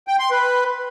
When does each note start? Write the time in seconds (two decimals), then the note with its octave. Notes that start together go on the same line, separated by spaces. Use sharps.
0.08 G5
0.19 C6
0.31 B4